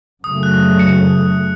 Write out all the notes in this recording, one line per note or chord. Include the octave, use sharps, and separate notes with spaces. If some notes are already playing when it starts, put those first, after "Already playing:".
F#2 C#3 F#3 A3 D#6
F#6
C#7